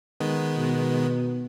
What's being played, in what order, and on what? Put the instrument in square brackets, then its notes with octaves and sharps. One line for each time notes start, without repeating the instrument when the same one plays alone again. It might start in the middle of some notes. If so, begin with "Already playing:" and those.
[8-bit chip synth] D#3 G#3 B3
[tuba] B2